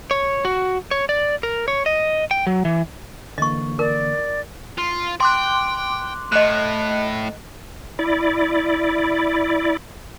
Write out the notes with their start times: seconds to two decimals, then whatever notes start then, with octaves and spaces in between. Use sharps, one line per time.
0.11 C#5
0.45 F#4
0.91 C#5
1.09 D5
1.43 A#4
1.68 C#5
1.86 D#5
2.31 G5
2.47 F#3
2.65 E3
3.38 D3 E3 A#3 D#5 C#6
3.79 A#4 D5
4.78 F4
5.20 G5 C6 D6 F#6
6.32 A2 D#5 F#6
7.99 E4 D5